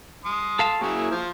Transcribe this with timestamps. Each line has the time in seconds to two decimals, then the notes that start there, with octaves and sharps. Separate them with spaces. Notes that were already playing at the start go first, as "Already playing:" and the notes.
0.25 C6 D#6
0.59 A4 F5 A5
0.81 F#3 A#3 E4 G#4 C#6
1.11 F3 C5